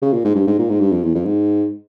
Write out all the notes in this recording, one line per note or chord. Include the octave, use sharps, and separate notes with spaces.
C#3
A#2
G#2
G2
G#2
A#2
G#2
G2
F2
E2
F2
G#2